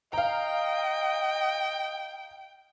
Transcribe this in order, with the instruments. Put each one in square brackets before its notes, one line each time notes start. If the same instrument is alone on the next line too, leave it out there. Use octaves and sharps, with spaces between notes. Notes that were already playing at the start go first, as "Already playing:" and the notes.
[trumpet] D#5 [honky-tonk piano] F5 A#5 [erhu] G5